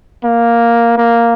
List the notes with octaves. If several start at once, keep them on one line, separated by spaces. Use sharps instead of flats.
A#3
A#3